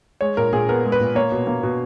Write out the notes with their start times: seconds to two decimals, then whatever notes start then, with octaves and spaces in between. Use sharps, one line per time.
0.21 G#3 C#5
0.37 A#2 A#4
0.53 A#2 G#4
0.69 B3 A#4
0.85 G#3
0.92 B4
1.00 A#2
1.15 A#3 C#5
1.32 B2
1.47 A#3
1.63 B2